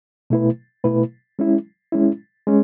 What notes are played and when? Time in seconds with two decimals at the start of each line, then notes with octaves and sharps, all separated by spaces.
0.30 B2 A3 E4 B4
0.84 B2 A3 E4 B4
1.39 G#3 C#4 E4
1.92 G#3 C#4 E4
2.47 G#3 C#4